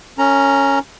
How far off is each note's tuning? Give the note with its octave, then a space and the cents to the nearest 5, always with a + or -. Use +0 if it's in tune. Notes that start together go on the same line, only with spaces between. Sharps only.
C#4 +0 A#4 -45 A#5 +0